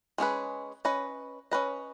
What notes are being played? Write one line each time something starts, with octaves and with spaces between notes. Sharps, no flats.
G#3 C#4 G#4 B4
C#4 B4 D#5
C#4 B4 D#5